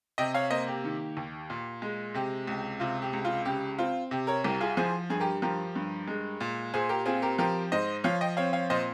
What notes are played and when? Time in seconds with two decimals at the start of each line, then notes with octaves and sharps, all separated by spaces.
0.18 C3 D#5 G5
0.34 C#5 F5
0.50 A#3 C5 D#5
0.68 G4
0.84 D#3
1.17 D#2
1.50 A#2
1.82 G#3
2.14 C3 G4
2.47 C#2
2.80 C3 F4
3.02 G4
3.13 C#2
3.25 F4
3.45 C#3 G4
3.78 C4 F4
4.11 C3 G4
4.27 A#4 C#5
4.44 C2 G4 A#4
4.61 F4 G#4
4.77 F3 G#4 C5
5.10 G2 G#4
5.20 G4 A#4
5.42 F3 G4 A#4
5.76 G2
6.08 G#3
6.40 A#2
6.74 A#2 G#4 C5
6.89 G4 A#4
7.06 C4 F4 G#4
7.22 G4 A#4
7.39 F3 G4 A#4
7.72 G#2 C5 D#5
8.04 F3 C#5 F5
8.21 D#5 G5
8.37 C4 C#5 F5
8.53 C#5 F5
8.70 A#2 C5 D#5